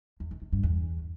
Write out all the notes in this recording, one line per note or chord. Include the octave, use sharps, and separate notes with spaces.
E2
D#3
D#3
G2
E2